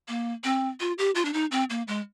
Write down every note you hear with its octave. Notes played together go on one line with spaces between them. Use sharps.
A#3
C4
F4
G4
F4
D4
D#4
C4
A#3
G#3